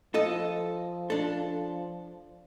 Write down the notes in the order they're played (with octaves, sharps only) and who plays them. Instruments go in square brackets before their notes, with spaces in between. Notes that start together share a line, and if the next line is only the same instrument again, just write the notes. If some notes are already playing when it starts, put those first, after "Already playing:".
[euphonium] F3 [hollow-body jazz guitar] A4 D#5
[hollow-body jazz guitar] D4 A4